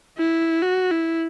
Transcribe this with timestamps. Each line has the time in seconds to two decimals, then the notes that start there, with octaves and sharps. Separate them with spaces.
0.18 E4
0.62 F#4
0.91 E4